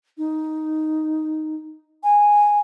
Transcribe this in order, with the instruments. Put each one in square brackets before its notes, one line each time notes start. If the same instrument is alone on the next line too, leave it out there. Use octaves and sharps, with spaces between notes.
[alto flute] D#4
G#5